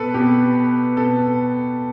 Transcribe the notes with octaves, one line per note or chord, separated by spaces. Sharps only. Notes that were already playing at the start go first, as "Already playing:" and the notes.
Already playing: B2 A4 B4
B2 G4
B2 A4